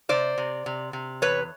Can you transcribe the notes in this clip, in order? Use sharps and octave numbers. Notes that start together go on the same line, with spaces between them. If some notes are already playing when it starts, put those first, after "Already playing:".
C3 C5 D5
C3
C3
C3
E2 B4 C#5